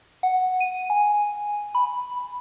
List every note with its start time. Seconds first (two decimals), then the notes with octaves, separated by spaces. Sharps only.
0.23 F#5
0.60 D#7
0.90 G#5
1.75 B5